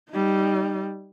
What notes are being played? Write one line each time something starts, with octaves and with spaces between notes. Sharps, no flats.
G3 D#4